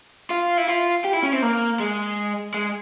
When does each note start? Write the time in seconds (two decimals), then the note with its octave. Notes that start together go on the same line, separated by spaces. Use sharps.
0.31 F4
0.58 E4
0.68 F4
1.05 G4
1.14 E4
1.23 C#4
1.33 C4
1.43 A#3
1.80 G#3
2.54 G#3